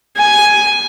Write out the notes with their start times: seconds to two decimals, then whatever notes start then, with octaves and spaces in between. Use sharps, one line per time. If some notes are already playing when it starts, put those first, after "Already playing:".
0.17 G#5